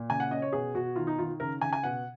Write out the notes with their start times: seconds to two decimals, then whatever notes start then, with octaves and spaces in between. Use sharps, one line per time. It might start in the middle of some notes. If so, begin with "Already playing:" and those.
Already playing: A#2
0.09 C#3 G#5
0.20 F#5
0.31 C#4 D#5
0.42 C#5
0.52 B2 G#4
0.74 B2 F#4
0.96 D#3 F4
1.07 D#4
1.19 D#3 F4
1.40 C#3 A#4
1.61 C#3 G#5
1.73 G#5
1.83 B2 F#5